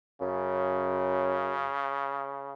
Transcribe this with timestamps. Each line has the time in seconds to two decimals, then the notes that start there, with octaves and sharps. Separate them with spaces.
0.21 F#2 C#3